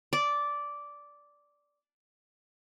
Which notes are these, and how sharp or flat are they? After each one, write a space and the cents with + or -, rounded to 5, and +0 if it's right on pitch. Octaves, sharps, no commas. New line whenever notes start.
D5 -10